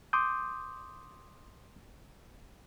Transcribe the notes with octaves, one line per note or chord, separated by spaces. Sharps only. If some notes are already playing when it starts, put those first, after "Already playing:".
C6 D6 D#6 G6